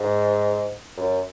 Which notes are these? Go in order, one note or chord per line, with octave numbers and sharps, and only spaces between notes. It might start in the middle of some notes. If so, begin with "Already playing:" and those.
Already playing: G#2
F#2